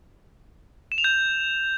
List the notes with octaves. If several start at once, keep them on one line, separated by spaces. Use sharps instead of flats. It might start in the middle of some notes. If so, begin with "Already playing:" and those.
E7
F7
G6